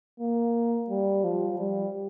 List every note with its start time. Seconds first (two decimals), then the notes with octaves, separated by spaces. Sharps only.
0.20 A#3
0.90 G3
1.24 F3
1.59 G3